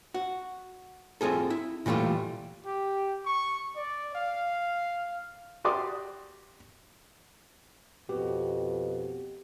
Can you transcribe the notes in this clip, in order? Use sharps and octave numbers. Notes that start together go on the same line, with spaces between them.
F#4
C4 F4 G#4 A4
E4
A#2 E3 G3 A3 F4
G4
C#6
D5
F5
F#4 G4 D5 C6 D6 D#6
F2 B2 B3 F#4 G4